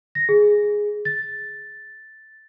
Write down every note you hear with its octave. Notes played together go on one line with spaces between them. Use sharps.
A#6
G#4
A6